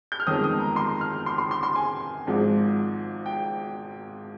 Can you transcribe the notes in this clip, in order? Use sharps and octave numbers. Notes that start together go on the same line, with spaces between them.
G6
F6
G1 F2 D#3 G#3 D#6
D#6
A#5
C6
F6
C6
C6
C6
C6
G#5
G#1 G#2 F3 G#3
G5